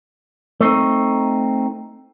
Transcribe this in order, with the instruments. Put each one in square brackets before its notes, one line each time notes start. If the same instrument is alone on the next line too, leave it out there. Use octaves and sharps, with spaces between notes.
[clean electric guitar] A3 C4 D#4